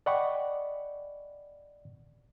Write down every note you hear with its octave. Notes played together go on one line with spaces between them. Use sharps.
D5 D#5 F#5 G5 B5 C#6